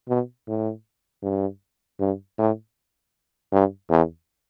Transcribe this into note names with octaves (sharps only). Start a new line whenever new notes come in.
B2
A2
G2
G2
A2
G2
E2